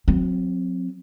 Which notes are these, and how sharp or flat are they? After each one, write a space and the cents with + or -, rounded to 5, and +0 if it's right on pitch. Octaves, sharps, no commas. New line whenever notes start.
F#3 -30 C4 +0